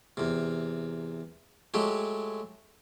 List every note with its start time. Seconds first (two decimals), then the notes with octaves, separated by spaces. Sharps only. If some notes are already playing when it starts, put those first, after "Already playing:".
0.17 E2 C3
1.74 F#3 G#3 A3 G4